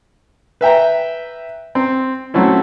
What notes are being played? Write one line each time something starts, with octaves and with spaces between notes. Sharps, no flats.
B4 E5 G5 A#5
C4
F#3 A3 C4 C#4 E4